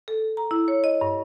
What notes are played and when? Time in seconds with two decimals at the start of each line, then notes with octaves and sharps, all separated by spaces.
0.08 A4
0.37 A#5
0.51 E4
0.68 C#5
0.84 D#5
1.01 G2